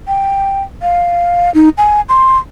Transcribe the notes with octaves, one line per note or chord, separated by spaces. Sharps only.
G5
F5
D#4
G#5
C6